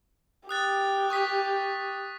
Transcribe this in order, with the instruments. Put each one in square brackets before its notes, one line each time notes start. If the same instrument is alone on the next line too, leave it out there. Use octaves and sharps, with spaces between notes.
[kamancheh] G4 [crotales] D#6 F#6 A6
[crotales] C#6 D#6 B6